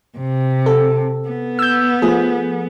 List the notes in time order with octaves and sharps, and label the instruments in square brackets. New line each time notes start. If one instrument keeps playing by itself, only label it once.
[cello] C3
[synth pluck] A4
[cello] B3
[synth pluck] E6 G6
F3 A3 G#4